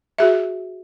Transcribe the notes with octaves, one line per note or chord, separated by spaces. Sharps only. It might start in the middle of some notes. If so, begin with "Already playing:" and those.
F#4 G#4 E5